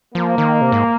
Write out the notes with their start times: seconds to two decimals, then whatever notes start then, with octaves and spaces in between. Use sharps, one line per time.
0.15 F3 A#3
0.38 D#3
0.61 C3
0.72 G#2